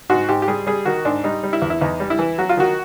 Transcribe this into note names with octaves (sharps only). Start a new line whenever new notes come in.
G#2 F#4
G#2 G4
G4
G3 G#4
G3 G#4
D#3 F#4
G#2 D4
G3 D#4
G3
E4
E2
E4
E2 D#4
G3
E4
E3
F#3 F#4
F4
D#3 F#4